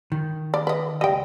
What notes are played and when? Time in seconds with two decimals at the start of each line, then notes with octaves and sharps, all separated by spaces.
0.12 D#3
0.54 D5
0.67 B4 D#5
1.01 C#2 C#3 G3 D#5 G5